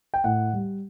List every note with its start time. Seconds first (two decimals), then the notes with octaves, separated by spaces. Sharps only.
0.14 G5
0.24 A2 F#5
0.53 G3